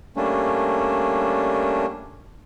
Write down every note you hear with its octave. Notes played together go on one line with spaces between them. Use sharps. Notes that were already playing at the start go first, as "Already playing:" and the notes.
G3 A3 A#3 C#4 D4